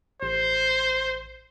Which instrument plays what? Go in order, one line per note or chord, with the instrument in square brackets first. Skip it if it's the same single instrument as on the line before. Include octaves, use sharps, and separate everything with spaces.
[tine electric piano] A1 [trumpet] C5